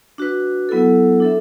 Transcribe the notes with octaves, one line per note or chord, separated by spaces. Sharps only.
D4 F#4 B4
F#3 B3 E4 A4
D4 A4 E5